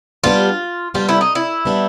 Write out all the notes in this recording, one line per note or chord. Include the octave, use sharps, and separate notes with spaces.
G3 B3 D4 F4 G4
G3 B3 D4 F4 G4
E4
D#4
E4
G3 B3 D4 G4